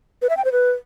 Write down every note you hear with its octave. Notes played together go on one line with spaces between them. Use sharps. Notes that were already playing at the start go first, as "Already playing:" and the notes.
B4
E5
G5
C5
B4